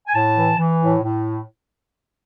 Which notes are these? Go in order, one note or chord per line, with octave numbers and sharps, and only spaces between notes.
G#5
A2 A5
E3
E3
A2
A2